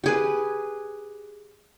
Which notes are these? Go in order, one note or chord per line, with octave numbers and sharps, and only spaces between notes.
G4 G#4 B4